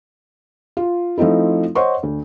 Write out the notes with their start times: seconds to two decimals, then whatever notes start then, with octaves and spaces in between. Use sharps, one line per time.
0.77 F4
1.18 F3 A3 C4 D#4 E4
1.75 C5 C#5 D#5 F#5 C6 C#6
2.03 D2